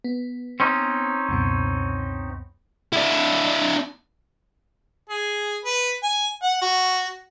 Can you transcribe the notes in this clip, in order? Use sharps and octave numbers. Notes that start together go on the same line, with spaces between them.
B3
C4 C#4 D#4
C#2 F#2 B2
D4 E4
G#4
B4
G#5
F#5
F#4